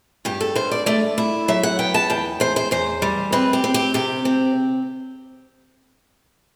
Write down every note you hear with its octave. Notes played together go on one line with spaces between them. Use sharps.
G2 G4
A4
G2 C5
D5
A3 D5
E4
F#3 E5
F#5
B3 G5
A5
E2 G5
E2 C5
C5
E2 C5
G3
C4 B4
G4
C4
G4
C3 G4
C4